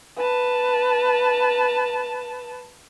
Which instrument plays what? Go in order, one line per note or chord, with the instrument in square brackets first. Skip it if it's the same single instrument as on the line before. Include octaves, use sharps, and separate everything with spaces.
[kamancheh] B4 A5